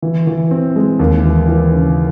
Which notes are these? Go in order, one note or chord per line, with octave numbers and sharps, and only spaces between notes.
E3
E3
C4
G#3
D#2
E3
E3
C#3